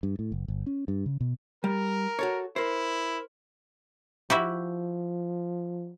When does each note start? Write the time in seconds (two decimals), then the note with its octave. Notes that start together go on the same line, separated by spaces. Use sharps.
0.03 G2
0.19 A2
0.32 F#1
0.48 G1
0.66 C#4
0.88 G2
1.06 C#3
1.21 B2
1.64 G3 A#4
2.19 F#4 A4 C#5
2.56 E4 A#4 C5
4.30 F3 E4 F#4 G4